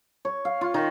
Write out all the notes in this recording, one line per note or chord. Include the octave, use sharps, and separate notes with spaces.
C#5
F5
F4
D#3